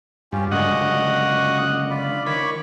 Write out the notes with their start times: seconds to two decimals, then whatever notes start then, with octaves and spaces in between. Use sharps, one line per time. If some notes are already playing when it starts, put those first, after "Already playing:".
0.33 G2 C#4 F4 G4
0.52 C#2 F#2 D3 F#4 D#5 F5 F#5 D6
1.90 F4 D5 B5
2.26 D#3 C#5 B5 C#6 D6